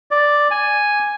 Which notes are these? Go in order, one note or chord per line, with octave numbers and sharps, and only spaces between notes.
D5
G#5